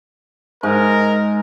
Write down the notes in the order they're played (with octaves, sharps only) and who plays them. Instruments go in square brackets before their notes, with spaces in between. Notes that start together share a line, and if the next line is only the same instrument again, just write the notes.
[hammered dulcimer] G#2 [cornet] A#4